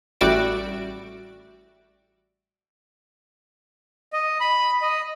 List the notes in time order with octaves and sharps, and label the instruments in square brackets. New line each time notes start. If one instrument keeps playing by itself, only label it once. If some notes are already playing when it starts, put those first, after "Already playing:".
[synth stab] A1 G3 F#4 D5 E5 D7
[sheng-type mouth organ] D#5
B5
D#5